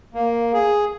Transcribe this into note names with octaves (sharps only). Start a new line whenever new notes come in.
A#3
G#4